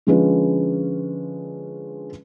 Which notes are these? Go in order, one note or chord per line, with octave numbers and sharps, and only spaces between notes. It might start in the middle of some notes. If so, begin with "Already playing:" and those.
D3 F3 G#3 C#4 F4 B4